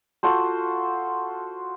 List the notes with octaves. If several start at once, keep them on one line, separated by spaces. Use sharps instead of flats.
F4 F#4 A4 C5